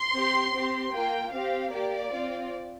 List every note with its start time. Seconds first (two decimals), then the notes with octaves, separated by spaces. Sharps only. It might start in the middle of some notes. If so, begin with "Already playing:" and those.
Already playing: C6
0.13 C4 G4
0.53 C4 G4
0.92 A#3 F4 G5
1.32 C4 G4 F5
1.72 A#3 G4 D5
2.12 C4 F4